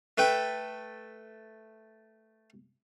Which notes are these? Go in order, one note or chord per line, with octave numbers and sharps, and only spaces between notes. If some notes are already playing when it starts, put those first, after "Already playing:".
A3 B4 G5